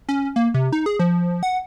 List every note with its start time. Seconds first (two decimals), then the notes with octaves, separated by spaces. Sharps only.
0.09 C#4
0.36 A#3
0.54 C3
0.72 D#4
0.86 G#4
0.99 F3
1.43 F#5